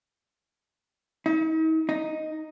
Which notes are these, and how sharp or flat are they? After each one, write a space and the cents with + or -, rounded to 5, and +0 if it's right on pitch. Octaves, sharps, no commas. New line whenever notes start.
D#4 +45
D#4 +0